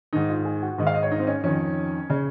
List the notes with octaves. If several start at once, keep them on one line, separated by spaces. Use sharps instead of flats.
G#2 D#3 D#4
F4
G#4
F#4
G#2 D#3 D#5
F5
D#5
C#5
D#4
C4
C#4
F2 D#3 C#4
C#3